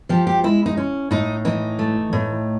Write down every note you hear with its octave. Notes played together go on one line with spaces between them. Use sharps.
F3 G4
G4
G#3 E4
D#4
C#4
A2 D#4
E3 D#4
A3
A2